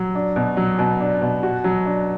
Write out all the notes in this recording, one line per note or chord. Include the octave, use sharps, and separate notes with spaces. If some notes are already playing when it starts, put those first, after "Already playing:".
Already playing: F#3
D4
B2
F#3
B2
D4
B2
F#4
F#3
D4